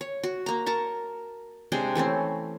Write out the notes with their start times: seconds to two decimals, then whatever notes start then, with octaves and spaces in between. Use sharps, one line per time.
0.01 C#5
0.23 F#4
0.46 A#3 A#5
0.66 A#4 A5 A#5 C#6
1.72 C3 G#3 D4 G5
1.95 E3 A3 C4 C#4